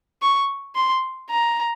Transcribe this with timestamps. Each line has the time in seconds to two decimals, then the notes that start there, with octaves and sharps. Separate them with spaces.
0.22 C#6
0.76 C6
1.30 A#5